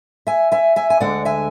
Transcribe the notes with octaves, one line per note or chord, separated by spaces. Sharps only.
E5 G#5
E5 G#5
E5 G#5
G#5
D2 D3 G#3 D5 F#5
E5 G#5